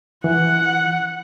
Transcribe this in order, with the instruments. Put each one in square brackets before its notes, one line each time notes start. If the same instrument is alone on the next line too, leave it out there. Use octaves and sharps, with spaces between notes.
[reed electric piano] E3 [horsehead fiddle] F#5